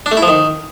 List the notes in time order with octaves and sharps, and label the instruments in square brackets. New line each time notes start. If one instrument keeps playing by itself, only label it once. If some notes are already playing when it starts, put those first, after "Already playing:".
[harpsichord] D4
A3
E4
F3
D#3